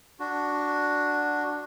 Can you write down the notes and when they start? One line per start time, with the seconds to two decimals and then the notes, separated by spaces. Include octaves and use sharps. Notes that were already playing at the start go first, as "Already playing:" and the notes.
0.20 D4 F#4